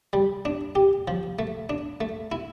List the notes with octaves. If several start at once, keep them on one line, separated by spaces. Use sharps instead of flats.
G3
D4
G4
F3
A3
D4
A3
E4